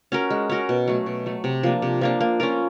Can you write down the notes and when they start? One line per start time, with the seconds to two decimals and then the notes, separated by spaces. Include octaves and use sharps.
0.12 C#4 F#4 A#4
0.30 G#3
0.49 C#4 F#4 A#4
0.69 B2
0.88 F#3 A3
1.06 B2
1.26 F#3 A3
1.44 C3
1.63 F3 A#3 D4
1.82 C3
2.01 F3 A#3 D4
2.21 A#3
2.40 C#4 F4 A#4